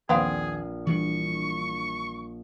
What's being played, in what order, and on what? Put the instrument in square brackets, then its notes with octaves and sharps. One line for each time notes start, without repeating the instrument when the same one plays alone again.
[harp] A#1 [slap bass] D#2 [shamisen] B3 C4 F5 [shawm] G#4
[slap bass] E3 G3 D4 [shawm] C#6